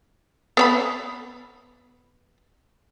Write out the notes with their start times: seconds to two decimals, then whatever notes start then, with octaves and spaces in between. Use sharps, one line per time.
0.57 B3 C#5 B5